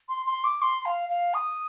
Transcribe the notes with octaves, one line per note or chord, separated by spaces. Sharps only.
C6
C6
D6
C6
F5
F5
D#6